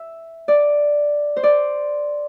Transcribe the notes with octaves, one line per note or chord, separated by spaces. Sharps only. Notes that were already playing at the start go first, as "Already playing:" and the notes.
Already playing: E5
D5
C5
D5